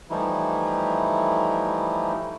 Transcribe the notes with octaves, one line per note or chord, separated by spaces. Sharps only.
E3 F3 G3 A3 D#4 E4